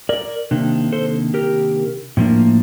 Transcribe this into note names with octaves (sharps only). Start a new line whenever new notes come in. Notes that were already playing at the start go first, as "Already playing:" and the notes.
A#4 D5
C3 D#3 A#3 D4
A4 C5
G4 A#4
A2 F3 A#3 D4